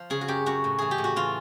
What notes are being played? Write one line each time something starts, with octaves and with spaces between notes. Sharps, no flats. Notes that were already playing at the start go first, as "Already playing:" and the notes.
Already playing: F3
C#3 G#4
F#4
F#2 G4
F#2 F#4
A2
E3 G#4
G4
A2
F#4
E3 F4